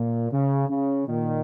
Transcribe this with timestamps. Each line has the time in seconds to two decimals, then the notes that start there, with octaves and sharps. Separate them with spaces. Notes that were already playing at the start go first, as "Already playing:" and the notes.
Already playing: A#2
0.31 C#3
0.69 C#3
1.07 A#2 D#3